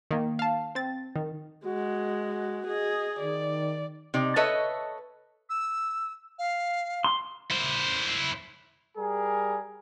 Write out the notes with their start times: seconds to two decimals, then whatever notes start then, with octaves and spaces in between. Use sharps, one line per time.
0.11 D#3 A#3
0.39 F5 A5
0.75 C4 A6
1.16 D#3
1.66 G#3 F#4
2.67 G#4 D#5
3.19 D#3 D5
4.14 C3 D#4 D5
4.36 A4 B4 C#5 D#5 E5 A5
5.50 E6
6.39 F5
7.04 C6
7.51 E4 C5
8.97 G3 G#4 A#4